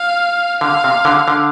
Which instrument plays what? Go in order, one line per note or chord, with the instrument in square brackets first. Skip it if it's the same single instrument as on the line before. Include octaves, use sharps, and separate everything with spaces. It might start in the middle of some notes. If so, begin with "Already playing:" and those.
Already playing: [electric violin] F5
[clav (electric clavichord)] D3 [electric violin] F5
[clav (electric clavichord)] C3
D3
D3